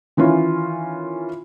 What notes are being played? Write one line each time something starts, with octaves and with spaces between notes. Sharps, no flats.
D#3 E3 C#4 F4